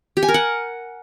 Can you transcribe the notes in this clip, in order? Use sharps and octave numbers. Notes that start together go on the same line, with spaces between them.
G4
G#5
A#4
F#5